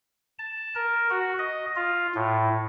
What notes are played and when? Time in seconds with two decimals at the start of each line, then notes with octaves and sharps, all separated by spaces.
0.39 A5
0.75 A#4
1.10 F#4
1.39 D#5
1.76 F4
2.15 A2